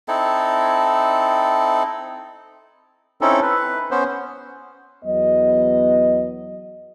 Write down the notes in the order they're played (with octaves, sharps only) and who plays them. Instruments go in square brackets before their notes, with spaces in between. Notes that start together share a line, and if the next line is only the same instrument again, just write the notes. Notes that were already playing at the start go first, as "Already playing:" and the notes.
[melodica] C4 D#4 E4 A4
[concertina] C4 C#4 D#4 E4 A4
B4
B3 C#4 C5
[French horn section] E2 F#3 B3 D#5